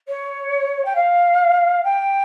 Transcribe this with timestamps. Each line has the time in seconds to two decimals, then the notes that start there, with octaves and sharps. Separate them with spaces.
0.08 C#5
0.84 G5
0.95 F5
1.83 G5